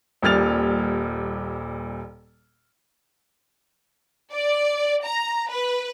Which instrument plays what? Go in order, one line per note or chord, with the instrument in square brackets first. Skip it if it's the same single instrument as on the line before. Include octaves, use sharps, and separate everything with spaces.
[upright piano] D#1 A#2 G3 F6 A6 F7
[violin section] D5
A#5
B4